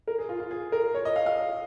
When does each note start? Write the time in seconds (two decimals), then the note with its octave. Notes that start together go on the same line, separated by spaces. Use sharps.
0.08 A#4
0.18 G#4
0.29 F4
0.40 F4
0.51 G#4
0.72 A#4
0.95 C#5
1.05 D#5
1.16 F5
1.26 F5